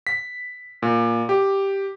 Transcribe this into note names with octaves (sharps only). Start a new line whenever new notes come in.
B6
A#2
G4